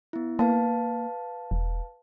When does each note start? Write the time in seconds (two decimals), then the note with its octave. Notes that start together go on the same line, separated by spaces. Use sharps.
0.13 B3 E4
0.39 A#3 B4 F5 A5
1.51 E1